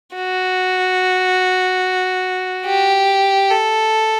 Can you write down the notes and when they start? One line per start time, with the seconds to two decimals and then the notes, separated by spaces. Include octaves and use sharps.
0.16 F#4
2.66 G4
3.50 A4